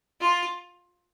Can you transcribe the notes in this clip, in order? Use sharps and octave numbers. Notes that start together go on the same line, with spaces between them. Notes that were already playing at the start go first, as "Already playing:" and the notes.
F4